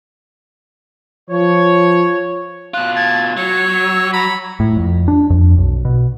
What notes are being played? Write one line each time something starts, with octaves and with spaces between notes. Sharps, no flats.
F3 C#5
B2 F4 F#6
A5 G#6
F#3 C#5 C#7
E6
A#5 B5
A2
F2
D4
F2
B1
B2